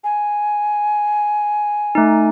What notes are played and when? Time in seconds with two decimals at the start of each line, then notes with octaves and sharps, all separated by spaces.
0.04 G#5
1.95 A3 D#4